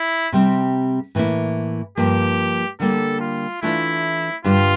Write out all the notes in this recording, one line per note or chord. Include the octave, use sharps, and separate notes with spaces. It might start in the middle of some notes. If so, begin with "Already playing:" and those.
Already playing: E4
C3 G3 C4
A2 E3 A#3 E4
G2 F3 A#3 G4
D3 G3 A#3 A4
F4
E3 A3 D4 E4 F4
G2 D3 G3 D4 F4 G4